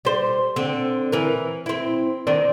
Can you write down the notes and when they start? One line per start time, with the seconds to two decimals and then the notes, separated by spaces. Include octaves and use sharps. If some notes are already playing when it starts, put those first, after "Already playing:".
0.05 G3 C5
0.56 D3 C4
1.12 E3 A#4
1.66 C4 E4
2.27 D#3 C4 D4